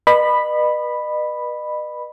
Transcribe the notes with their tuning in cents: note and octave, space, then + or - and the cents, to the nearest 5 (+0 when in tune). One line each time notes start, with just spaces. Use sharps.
B4 -30 D#5 -40 B5 +0